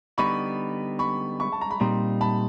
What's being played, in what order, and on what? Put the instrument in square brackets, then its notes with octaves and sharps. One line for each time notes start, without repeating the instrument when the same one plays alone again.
[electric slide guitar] D3 G3 B3 D#4 [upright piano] B5 C#6
[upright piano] B5 C#6
B5 C#6
A5
A#5
B5
[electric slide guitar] A#2 G3 C4 D#4 [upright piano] A#5 C6
[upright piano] A5 B5